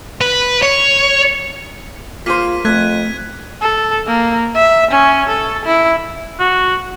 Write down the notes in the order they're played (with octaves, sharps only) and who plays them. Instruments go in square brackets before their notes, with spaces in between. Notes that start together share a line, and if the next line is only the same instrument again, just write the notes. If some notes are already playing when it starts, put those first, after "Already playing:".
[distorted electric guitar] B4
C#5
[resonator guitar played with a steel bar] A#3 G#4 C5 [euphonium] F4 [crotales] B6 D#7
[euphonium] F2 [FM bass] A3 [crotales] F#6 G#6 B6
[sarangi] A4
A#3
E5
C#4
A4
E4
[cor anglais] F#4